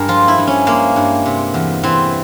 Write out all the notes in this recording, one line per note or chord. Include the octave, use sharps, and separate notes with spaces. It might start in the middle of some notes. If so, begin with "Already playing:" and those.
Already playing: G2 G#3 A#4
F3 F4
E4
G2
C#4
G#3 A#3
G2
C3
E2
E3 C4